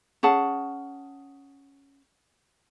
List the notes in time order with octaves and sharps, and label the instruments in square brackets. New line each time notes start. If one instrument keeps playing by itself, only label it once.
[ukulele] C#4 G#4 F#5 A5